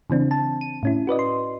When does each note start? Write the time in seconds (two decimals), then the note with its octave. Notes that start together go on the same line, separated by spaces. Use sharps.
0.10 C#3 E3 C4 D4
0.31 A5
0.61 D#7
0.83 A2 C#4 E4
1.07 F#4 B4 D5 D#5
1.19 C6